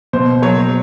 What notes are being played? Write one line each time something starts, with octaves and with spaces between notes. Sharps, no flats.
B2 C5
F#3 C#5